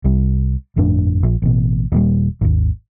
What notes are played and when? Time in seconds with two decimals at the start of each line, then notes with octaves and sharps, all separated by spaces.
0.04 C2 G3
0.76 G1 F2 A2 D4
1.23 A#1
1.42 A1 B2
1.92 D#1 A#2 G3
2.41 G#1 D#2